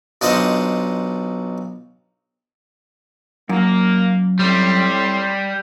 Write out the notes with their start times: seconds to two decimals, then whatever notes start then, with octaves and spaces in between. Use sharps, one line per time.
0.21 B1 D4 F4 C5 D#5 F#5
3.49 F#2 A#3
4.39 A2 G3 C4 C6